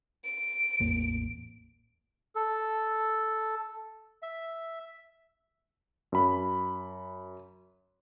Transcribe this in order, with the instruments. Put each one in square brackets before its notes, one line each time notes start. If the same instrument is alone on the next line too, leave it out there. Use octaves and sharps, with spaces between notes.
[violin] D7
[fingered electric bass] A1 E2 A#3
[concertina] A4
E5
[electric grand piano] F#2 B5